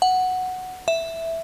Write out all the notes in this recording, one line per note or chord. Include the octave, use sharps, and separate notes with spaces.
F#5
E5